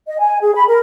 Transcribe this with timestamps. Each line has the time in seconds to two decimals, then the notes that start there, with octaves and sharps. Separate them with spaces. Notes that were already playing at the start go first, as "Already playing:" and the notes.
0.07 D#5
0.20 G#5
0.42 G#4
0.55 B5
0.68 A#4